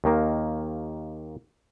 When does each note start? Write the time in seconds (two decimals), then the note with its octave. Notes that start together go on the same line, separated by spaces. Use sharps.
0.04 D#2 D#3 A#3